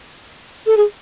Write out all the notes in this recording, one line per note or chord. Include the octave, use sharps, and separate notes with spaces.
A4
G#4